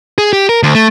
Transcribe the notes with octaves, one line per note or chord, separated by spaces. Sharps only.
G#4
G4
A#4
D2
A3